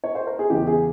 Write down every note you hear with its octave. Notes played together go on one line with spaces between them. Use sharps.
C#5
C5
A#4
G#4
E2 C#3 E3 G4
G#4